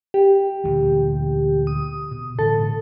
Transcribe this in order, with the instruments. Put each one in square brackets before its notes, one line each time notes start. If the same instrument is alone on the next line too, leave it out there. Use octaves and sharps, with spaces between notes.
[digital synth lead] G4
[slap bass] D2 A#2 E3
[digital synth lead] D#6
[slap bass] B2
[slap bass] A2 D3 E3 [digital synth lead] A4